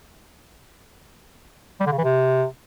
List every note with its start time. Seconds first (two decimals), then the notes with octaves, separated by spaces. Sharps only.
1.80 G3
1.86 D3
1.92 C#3
1.98 E3
2.04 C3